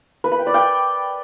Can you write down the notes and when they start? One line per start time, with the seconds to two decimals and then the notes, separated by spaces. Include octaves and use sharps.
0.24 B4
0.32 B5
0.39 G5
0.47 D5
0.54 G5